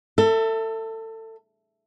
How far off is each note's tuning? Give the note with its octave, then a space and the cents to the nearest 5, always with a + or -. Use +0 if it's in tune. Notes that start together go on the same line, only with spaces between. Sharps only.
A4 +25 E5 +0